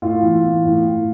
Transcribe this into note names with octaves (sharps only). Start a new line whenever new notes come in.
A2 F4
E3
E3
A2
A2